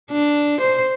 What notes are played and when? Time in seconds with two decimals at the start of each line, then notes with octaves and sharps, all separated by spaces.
0.11 D4
0.61 C5